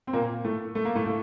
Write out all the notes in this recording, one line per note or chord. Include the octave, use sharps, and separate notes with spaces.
C4
A#2 A#3
A2 A3
A3
A#3
A2 A3
A2 A3